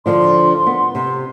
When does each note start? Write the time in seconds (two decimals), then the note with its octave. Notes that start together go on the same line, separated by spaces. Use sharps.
0.06 D3 F3 D4 C6
0.66 B3
0.95 C3